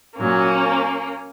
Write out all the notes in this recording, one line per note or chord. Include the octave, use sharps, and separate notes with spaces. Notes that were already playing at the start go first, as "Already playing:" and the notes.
A#2 F#3 A#3 C#4